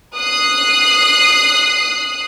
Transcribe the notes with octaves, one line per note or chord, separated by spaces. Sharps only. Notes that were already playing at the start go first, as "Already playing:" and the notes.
D#6 F#6 C7